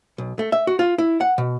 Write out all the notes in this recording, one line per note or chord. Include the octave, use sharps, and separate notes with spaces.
B1
A3
E5
F#4
F4
E4
F#5
B2